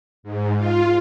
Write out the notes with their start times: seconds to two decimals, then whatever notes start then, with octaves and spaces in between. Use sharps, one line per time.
0.23 G#2
0.56 F4